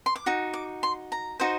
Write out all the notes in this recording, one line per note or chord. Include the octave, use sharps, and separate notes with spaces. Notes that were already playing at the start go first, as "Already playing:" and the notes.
C6
D6
D#4 F#4
D6
C6
A#5
D#4 F#4 C5 D#5